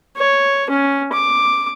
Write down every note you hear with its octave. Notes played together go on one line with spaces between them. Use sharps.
C#5
C#4
D6